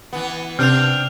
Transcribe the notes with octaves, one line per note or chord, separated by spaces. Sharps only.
E3 B3
C3 C4 D4 F6 G6 F7